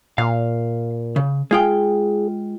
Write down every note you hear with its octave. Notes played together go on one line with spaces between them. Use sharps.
A#2 F5
C#3
G#3 F4 G#4 G5